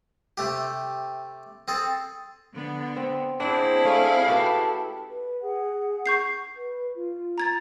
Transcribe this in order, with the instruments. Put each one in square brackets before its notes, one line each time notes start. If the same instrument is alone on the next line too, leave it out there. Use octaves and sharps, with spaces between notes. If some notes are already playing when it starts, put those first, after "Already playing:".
[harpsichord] C3 A3 G4
C4 G#4 A4
[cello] D3 B3
[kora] C4
[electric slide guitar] C4 D4 [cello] E4 G#4 [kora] F#5
[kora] A3 C#4 [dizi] F5
[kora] F#4 G4 B4 [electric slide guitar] A4
[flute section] B4
G#4 F#5
[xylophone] C#6 G6 C7
[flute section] B4
F4
[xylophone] A#5 G#6 A6